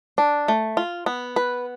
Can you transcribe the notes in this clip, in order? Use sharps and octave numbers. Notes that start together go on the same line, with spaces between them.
D4
A3
F4
B3
B4